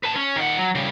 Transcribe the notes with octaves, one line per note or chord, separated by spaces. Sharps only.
B4 A5
C#4
D#3 F#5
F#3
C#3 G3